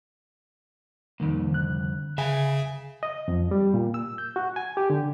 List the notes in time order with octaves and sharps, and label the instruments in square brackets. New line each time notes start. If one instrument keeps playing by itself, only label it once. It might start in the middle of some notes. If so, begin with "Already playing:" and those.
[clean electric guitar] C2 F2 [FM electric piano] D#3 A#3
[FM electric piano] D3 F#6
[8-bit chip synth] C#3 [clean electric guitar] E5 G#5
[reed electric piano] D#5
F2
G3
A#2
E6
G6
F#4
G#5
G4
D3